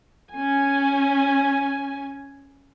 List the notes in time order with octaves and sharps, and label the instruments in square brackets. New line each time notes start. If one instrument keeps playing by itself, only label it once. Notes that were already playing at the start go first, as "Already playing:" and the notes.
[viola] C#4 G#5